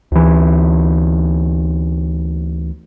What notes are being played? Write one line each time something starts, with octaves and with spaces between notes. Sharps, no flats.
D2 E3